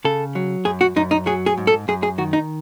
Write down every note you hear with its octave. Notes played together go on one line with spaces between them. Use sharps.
C#3 A4
F#3
F#2 G#4
F#4
F#2 D#4
D#4
F#3 G#4
G#4
G#2
A4
F#2 G#4
G#4
D#3 F#4
D#4